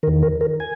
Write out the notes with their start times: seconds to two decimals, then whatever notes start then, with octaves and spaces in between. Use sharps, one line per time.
0.03 D#3 A#4
0.07 E2
0.22 A#4
0.41 A#4
0.60 G#5